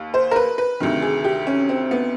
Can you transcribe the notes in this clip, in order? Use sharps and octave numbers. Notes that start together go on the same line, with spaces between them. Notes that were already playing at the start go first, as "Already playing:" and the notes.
Already playing: D#2
C5
A#4
B4
B4
D2 C3 D#3
G#4
G4
C#4
C4
B3